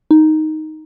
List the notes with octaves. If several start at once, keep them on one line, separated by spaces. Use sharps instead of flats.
D#4